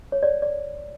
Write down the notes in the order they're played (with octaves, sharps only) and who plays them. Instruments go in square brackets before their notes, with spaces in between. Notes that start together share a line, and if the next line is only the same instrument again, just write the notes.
[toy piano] C#5
C#5 D5
D5